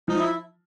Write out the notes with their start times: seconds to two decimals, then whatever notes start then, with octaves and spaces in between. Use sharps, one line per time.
0.08 F3 D#4
0.19 E4